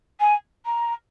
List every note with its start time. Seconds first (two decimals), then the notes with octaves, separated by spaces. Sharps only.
0.20 G#5
0.65 A#5